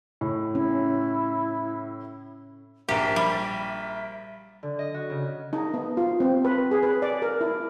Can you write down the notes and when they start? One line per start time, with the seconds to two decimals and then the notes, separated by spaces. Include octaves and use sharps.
0.21 A2
0.55 C#4 E4
2.89 A#1 G4 A#4 E5
3.16 G3 E5
4.63 D3
4.79 D#5
4.94 F#4
5.10 C#3
5.53 D#4
5.74 B3
5.97 F4
6.20 C4
6.45 B4
6.71 G#4
6.83 B4
7.02 D5
7.22 A#4
7.41 E4